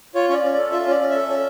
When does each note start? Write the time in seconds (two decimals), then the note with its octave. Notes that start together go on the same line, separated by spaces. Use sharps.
0.15 F4 C#5
0.29 C#4 C#5
0.33 D5
0.43 C#4
0.53 A4 D5
0.72 F4 E5
0.86 C#4 D5
1.00 C#4
1.10 A4 E5
1.29 C#4